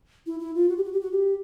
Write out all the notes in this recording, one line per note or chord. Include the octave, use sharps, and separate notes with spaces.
E4
E4
F4
F#4
G4
F#4
G4
F#4
G4